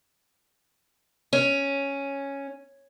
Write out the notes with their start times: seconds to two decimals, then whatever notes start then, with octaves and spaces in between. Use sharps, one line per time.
1.33 C#4